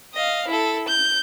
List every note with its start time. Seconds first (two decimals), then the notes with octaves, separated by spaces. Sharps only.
0.14 D#5 F5
0.48 E4 A4
0.88 G6